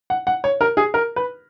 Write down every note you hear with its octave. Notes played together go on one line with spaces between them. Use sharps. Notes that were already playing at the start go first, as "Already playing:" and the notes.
F#5
F#5
C#5
A#4
G#4
A#4
B4